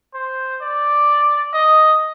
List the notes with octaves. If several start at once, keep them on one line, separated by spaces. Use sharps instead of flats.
C5
D5
D#5